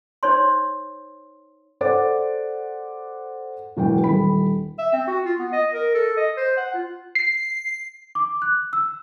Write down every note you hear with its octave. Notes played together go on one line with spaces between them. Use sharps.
D#4 C5 C#5 C6
A4 C5 D5 F#5 D6 A6
E1 E2 F#3 G5
D#1 B5
E5
C4
F#4
F4
B3
D#5
A#4
A4
D#5
C5
F#5
F4
C7
D6
F#6
E6